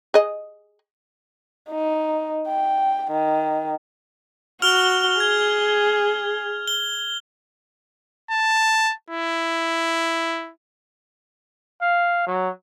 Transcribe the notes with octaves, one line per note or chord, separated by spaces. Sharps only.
G#4 D#5
D#4
G5
D#3
F#4 F6 F7 G7
G#4 G#6
G7
A5
E4
F5
F#3